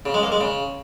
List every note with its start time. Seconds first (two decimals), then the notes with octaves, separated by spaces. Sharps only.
0.06 C#3
0.14 G#3
0.23 A#3
0.32 G#3
0.41 C#3